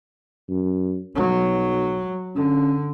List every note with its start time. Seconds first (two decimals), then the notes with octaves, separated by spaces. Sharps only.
0.49 F#2
1.16 B1 F#3
2.36 D3 C#4